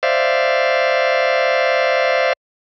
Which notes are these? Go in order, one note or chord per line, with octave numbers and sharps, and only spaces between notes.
C5 D5 E5 F5